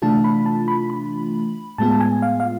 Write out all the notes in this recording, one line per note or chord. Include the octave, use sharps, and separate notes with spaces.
C3 E3 A3 D4 F4 A5
B5
A5
B5
B5
A2 G#3 B3 F4 A5
A5
G#5
F5
F5